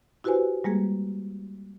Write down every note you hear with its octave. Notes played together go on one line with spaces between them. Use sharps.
E4 F#4 G4 B4 C5 G#5
G3 G#3 A#3 G#4